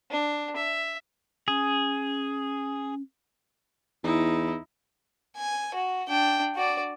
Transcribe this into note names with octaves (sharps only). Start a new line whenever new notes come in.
D4
E5
C#4 G#4
E2 D#4 E4
G#5
F#4
D4 G5
F#4 D5